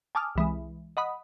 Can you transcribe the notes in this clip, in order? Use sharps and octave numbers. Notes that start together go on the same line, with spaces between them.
G#5 A5 D6 D#6 F6
C2 E3 G#3
D#5 F#5 B5 D#6